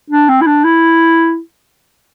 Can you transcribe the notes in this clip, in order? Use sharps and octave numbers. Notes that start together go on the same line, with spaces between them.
D4
C4
E4
D4
E4